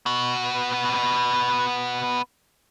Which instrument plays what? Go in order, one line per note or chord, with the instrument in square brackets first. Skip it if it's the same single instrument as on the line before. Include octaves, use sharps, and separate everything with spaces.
[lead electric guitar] B3 F#4